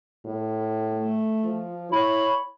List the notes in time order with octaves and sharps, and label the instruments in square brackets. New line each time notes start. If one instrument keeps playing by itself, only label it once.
[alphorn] A2
[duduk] A3
[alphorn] F3
[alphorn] E4 [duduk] C#5 [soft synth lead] B5